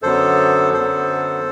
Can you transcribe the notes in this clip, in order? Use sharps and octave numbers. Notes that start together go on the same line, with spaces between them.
F#2 D3 F#3 B3 A4 C5
F#2 D3 F#3 B3 A4 C5